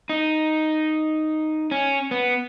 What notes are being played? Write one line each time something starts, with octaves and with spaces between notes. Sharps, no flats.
D#4
C#4
B3